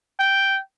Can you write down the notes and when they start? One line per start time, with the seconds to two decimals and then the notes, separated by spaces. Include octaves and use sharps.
0.19 G5